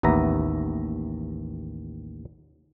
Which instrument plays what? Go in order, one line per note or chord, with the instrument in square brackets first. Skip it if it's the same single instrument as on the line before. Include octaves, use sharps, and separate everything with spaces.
[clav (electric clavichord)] A1 D#2 B3 E5 A#5